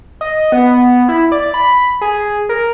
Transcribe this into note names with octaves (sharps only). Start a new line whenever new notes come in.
D#5
B3
E4
D5
B5
G#4
A#4